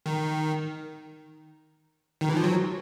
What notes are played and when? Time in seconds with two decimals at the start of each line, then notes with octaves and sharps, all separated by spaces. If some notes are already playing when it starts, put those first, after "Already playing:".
0.06 D#3
2.21 D#3
2.29 E3
2.37 F3
2.44 F#3